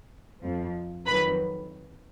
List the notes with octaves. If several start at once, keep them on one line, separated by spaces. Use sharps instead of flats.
F2 F3
F2 D#3 F#3 B4 B5